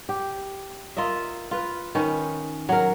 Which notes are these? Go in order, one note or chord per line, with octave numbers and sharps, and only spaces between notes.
G4
F4 A#4 D#5 E5
F4 B4
D#3 C#4 B4
F#3 A#4